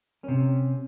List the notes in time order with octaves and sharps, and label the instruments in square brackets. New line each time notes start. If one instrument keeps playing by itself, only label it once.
[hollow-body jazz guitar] C3 C#4